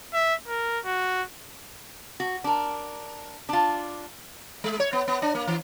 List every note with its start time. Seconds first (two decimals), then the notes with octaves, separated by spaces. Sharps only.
0.14 E5
0.48 A#4
0.85 F#4
2.20 F#4
2.44 D4 A#4
3.49 D4 F4
4.64 G#3
4.80 C#5
4.93 B3
5.08 B3
5.22 D4
5.35 A#3
5.48 E3